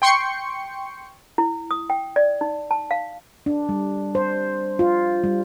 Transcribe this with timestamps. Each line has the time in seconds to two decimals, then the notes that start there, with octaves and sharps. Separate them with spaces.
0.02 G5 C6 C#6 C#7
1.38 E4
1.71 D#6
1.90 G5
2.16 D5
2.41 D#4
2.71 A5
2.91 F5
3.46 D4
3.69 G3
4.15 C5
4.79 F4
5.24 G3